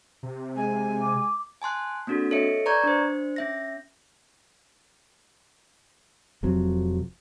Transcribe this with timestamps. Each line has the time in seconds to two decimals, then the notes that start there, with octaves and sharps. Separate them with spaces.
0.23 C3
0.56 G#3 G#5
1.01 D6
1.62 G#5 A5 C6 F#6
2.07 A#3 C4 D4 F#4 A4
2.31 A4 C#5 D#5 E5 C#7
2.66 B4 D5 A#5 C#6 G6 G#6
2.83 D4 C5
3.36 C#4 E5 A#6
6.43 F1 F3 F#3 C4